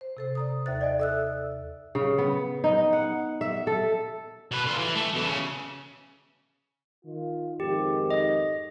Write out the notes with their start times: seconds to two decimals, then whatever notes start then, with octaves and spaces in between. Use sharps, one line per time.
0.01 C5
0.17 C3 A4 C5
0.35 D5 A#5 D#6
0.66 D#2 C5 E5 A6
0.81 D5 D#5 G#5
0.99 A4 E5 E6 F#6
1.95 C#3
2.18 B3
2.64 D#4
2.93 F#5
3.41 E5
3.67 A4
4.51 B2 B4
4.66 D3 F4
4.78 E3
4.95 A3
5.15 B2 E3
5.27 C#3
7.04 D#3 F4
7.60 F2 G#2 D#3 G4
8.11 D#5